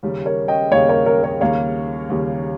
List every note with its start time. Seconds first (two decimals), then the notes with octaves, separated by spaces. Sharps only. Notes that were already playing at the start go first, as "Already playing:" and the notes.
0.03 D#2 C#3 G3 A#3
0.26 A#4 C#5
0.48 D#5 G5
0.71 D#2 C#3 G3 A#3 C#5 F5
0.89 A#4 C#5
1.06 A#4 C#5
1.23 A#4 C#5
1.41 D#2 C#3 G3 A#3 C#5 F5
2.10 D#2 C#3 G3 A#3